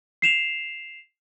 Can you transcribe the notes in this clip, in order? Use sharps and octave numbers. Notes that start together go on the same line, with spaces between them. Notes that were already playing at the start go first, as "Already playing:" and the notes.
C7 E7 F7